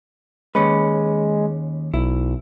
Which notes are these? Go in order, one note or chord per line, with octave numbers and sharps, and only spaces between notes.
D#2 G#3 C#4 B4
B1 E4